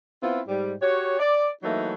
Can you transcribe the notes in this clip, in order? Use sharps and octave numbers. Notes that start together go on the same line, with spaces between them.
B3 C4 E4 F4
G#2 G3
F#4 G4 C#5
D5
E3 F#3 A3 A#3 D#4